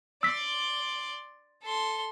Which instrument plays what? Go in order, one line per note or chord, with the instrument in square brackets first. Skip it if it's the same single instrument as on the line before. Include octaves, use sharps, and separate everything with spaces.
[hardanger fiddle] D5 C6 [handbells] E6 B6
[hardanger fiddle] A4 C6